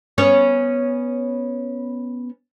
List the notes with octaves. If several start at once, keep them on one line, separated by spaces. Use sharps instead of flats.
B3 C#4 C#5